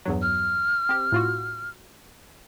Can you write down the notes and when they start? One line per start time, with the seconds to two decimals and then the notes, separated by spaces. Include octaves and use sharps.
0.05 E2 G2 F#3
0.22 F6
0.89 C4 G4
1.12 A2 F4 F#4